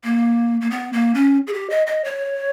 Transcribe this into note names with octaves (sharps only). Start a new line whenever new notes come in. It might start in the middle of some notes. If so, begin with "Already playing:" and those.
A#3
A#3
B3
A#3
C#4
G#4
G4
D#5
D#5
C#5